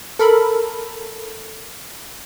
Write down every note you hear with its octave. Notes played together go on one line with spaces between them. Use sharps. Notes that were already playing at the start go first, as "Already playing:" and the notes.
A4 A#4 B5